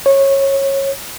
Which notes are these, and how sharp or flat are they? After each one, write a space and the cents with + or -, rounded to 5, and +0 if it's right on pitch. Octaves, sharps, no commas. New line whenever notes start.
C#5 -20